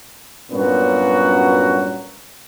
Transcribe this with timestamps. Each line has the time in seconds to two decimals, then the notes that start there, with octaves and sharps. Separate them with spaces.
0.52 G2 A#2 F#3 B3 C#4 F#4